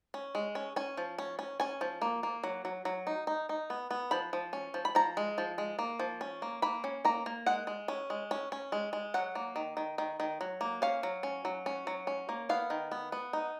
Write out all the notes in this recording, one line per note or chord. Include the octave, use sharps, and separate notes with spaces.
C#4
G#3
C#4
C#4 G#5
F3
C#4
C#4
C#4 G#5
F3
A#3
A#3
F#3
F#3
F#3
D#4
D#4
D#4
B3
B3
F3 B5
F3
C#4
F3
B5
F3 A#5
G#3
F3
G#3
A#3
F3
C#4
A#3
A#3 B5
C#4
A#3 A#5
A#3
G#3 F#5
G#3
C#4
G#3
C#4
C#4
G#3
G#3
F#3 F#5
A#3
D#3
D#3
D#3
D#3
F#3
A#3
C#4 F5
F#3
C#4
F#3
C#4
F#3
C#4
A#3
B3 F5
D#3
B3
B3
D#4